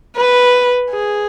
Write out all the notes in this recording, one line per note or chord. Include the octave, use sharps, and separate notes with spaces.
B4
G#4